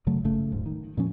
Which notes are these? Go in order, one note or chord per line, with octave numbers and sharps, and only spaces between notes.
F#2 C#3 F#3 A3
G1 C#3 A3
D#1 G#2
D#3
A#2 F3 C#4